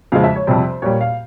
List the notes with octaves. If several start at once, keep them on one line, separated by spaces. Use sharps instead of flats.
F2 C#3 F3 G#3 F5
E5
C#5
F2 C3 G3 C5
A#2 G3 C#5
F5